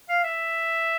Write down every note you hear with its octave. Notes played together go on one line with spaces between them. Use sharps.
F5
E5